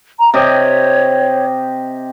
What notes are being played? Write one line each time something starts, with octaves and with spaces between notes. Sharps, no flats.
A#5
C3 G4 C#5 D#5